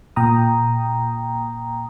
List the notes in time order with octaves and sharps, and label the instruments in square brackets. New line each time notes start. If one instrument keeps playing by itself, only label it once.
[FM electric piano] A#2 G5 A#5 D#6